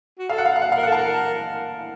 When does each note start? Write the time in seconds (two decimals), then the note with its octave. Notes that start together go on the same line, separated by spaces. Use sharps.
0.19 F#4
0.29 A4 F5
0.38 F#5
0.45 F5
0.56 F5
0.62 F#5
0.72 A#4 F5
0.83 A4 F#5
0.92 A5
0.98 A#4